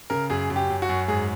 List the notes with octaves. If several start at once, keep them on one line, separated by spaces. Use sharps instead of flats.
C#3 A#4
F#2 G#4
F#2
G4
F#2
F#4
F#2
G#2 G#4